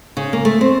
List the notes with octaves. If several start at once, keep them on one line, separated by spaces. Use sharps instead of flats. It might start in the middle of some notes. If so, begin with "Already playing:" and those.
C#3
A#3
A3
C4